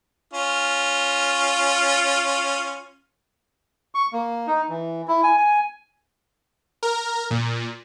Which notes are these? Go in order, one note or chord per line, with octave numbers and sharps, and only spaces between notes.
C#4 F4
C#6
A#3
D#4
E3
E4
G#5
G#5
A#4
A#2